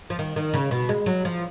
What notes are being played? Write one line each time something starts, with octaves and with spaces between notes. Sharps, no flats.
F3
D#3
D#3
C#3
B2
G#3
F#3
F3